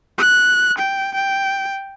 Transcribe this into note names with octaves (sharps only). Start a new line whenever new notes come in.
F#6
G5
G5